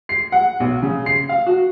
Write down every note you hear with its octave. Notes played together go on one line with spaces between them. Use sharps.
C7
F#5
B1
C#3
C7
F5
F#4